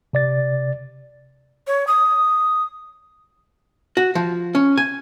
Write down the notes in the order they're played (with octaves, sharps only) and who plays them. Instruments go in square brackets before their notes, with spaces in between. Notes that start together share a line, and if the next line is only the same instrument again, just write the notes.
[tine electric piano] C3 D5 A6
[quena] C#5
D#6
[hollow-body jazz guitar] F#4
F3
C#4
G#5